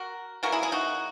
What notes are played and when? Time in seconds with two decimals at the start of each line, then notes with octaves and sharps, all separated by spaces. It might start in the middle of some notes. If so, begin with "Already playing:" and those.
Already playing: F#4 A#4
0.43 C#3 E3 A#3 F#4 A#4
0.52 E4 G#4
0.62 E4 G#4
0.72 D#4 F#4